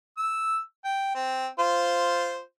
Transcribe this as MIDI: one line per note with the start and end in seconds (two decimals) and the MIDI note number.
0.17 0.58 88
0.84 1.11 79
1.15 1.47 60
1.59 2.41 65
1.59 2.41 72